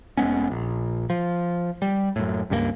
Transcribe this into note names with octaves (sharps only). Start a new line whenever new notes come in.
F1 G#3 B3 C#4
A#1
F3
G3
F#2 A2
C#2 G2 G3 A#3